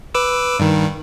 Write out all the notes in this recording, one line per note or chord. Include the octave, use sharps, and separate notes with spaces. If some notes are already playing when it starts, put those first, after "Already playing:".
B4 D6 E6
G2 D#3